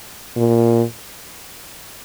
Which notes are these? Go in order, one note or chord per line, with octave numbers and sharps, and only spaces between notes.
A#2